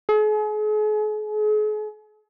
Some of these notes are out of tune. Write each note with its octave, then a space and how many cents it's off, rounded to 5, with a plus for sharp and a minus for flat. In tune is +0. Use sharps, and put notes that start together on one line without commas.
G#4 +40